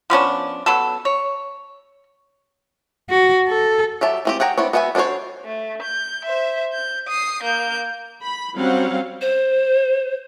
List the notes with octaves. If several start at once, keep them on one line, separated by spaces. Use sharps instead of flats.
F3 B3 C#4 D4
F#3 B3 A4
C#5
F#4
A4
F#3 G4 E5 A5
E3 C4 G4
G#4 F#5 G5 A#5
B3 C4 D4 E4 C#5
B3 F#4 E5 G5 G#5
B3 D4 F#4 C5 C#5
A3
G6
C5 E5
G6
D#6 C7
A#3 G6
B5
F#3 G3 C4 C#4 F5 F#5
C5